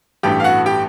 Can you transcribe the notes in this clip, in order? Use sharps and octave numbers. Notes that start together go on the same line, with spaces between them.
A1 G2 E3 A3 G4 G5
F5
F#4 F#5
G4 G5